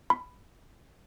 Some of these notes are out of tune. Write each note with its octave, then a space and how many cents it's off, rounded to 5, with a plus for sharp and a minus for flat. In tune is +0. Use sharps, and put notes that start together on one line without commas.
B5 +5